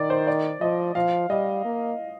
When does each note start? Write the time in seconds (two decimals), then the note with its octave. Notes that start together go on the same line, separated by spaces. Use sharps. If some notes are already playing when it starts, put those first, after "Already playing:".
Already playing: D#3 D5
0.10 C5
0.27 D5
0.61 F3 D#5
0.95 F3 F5
1.30 G3 D#5
1.64 A#3